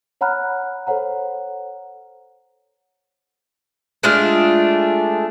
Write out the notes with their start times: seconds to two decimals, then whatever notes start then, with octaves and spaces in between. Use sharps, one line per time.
0.21 C#5 F#5 A#5 B5 F6 F#6
0.87 A4 C5 C#5 F#5 A#5
4.03 G#3 A3 D4 F4